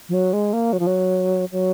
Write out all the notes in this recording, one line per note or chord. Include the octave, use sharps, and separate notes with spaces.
F3
F#3
G#3
A#3
F#3
F3
F#3
F#3